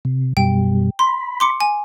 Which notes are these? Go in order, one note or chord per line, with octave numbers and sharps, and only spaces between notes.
C3
F#2 B2 G3 G5
B5 C6
C6 D6 C#7
G#5